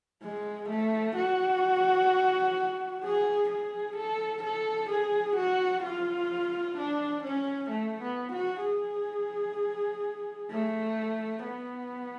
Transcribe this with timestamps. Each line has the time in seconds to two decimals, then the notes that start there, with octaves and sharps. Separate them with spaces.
0.23 G#3
0.69 A3
1.16 F#4
3.03 G#4
3.50 G#4
3.96 A4
4.43 A4
4.90 G#4
5.36 F#4
5.83 F4
6.78 D4
7.23 C#4
7.70 A3
8.02 B3
8.32 F#4
8.64 G#4
10.51 A3
11.45 B3